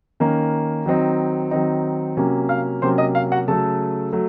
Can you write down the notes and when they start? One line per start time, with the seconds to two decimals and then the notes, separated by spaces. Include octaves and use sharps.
0.20 D#3 A#3 C#4
0.86 D#3 F#3 C4 D#4
1.51 D#3 F#3 C4 D#4
2.17 C3 F#3 A#3 C#4
2.49 F5 F6
2.82 C3 F#3 A#3 C#4 C5 C6
2.98 D#5 D#6
3.15 F5
3.32 F#4 F#5
3.48 C#3 F#3 A3 A4 A5
4.13 F#3 A3